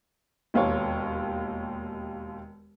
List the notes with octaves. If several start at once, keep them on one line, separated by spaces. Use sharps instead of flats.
E1 D#2 F4 C#5